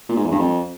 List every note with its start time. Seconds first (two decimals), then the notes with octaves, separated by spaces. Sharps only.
0.09 A#2
0.16 G#2
0.24 E2
0.32 G2
0.39 F2